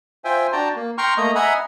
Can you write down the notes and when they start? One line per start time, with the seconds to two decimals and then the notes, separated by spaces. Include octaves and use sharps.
0.25 F4 C5 E5 G5 G#5
0.52 D4 F#4 G5 A5 A#5
0.76 A#3
0.98 G5 A#5 C6 C#6 F6
1.17 A3 A#3 D#5 A#5
1.35 D#5 E5 F#5 G#5 A#5 B5